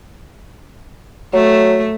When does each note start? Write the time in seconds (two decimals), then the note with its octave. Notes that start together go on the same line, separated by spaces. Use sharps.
1.34 F#3 A3